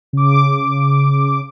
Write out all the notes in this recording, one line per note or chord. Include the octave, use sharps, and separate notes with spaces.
C#3 D6